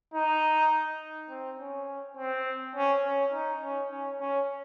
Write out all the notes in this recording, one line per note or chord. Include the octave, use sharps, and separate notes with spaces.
D#4
C4
C#4
C4
C#4
C#4
D#4
C#4
C#4
C#4